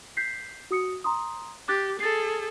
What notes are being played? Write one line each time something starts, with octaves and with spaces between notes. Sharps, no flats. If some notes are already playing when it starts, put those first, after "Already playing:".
G6 B6 C7
F#4 D#6 C#7
A#5 C6 D#6
G4 D6 F#6 A6
G#4 A4 A6 C7